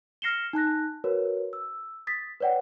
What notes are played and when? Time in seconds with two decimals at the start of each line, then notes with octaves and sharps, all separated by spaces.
0.22 F6 A#6 C7 C#7 E7 G7
0.53 D#4 A5 F#6 A#6
1.04 F#4 A#4 B4 C#5
1.53 E6
2.07 D#6 A6 B6
2.40 B4 C#5 D5 F#5 G5